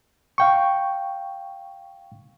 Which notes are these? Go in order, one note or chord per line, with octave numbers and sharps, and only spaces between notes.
F5 G5 C#6